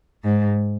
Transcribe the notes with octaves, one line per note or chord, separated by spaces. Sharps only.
G#2